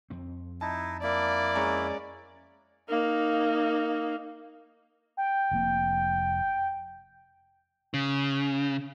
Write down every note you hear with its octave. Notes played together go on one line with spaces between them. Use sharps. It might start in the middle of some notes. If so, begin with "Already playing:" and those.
F2 C4
D#4 E4 A5
A#3 E4 D5
G#3 C#4 A#5
A#3 D#4
G5
F1 F2 A#3
C#3